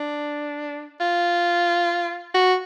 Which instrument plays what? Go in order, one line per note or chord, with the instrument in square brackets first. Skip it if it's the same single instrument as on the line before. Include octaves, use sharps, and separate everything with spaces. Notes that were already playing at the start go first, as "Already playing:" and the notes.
Already playing: [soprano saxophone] D4
F4
F#4